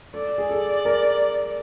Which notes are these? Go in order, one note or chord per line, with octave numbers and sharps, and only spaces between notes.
A4 D5
G#4
A4
A#4